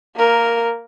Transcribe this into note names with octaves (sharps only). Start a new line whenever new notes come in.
A#3 A#4